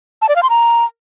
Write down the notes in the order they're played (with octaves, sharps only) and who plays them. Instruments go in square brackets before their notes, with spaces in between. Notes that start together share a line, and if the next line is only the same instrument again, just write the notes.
[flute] A5
D5
F5
C6
A#5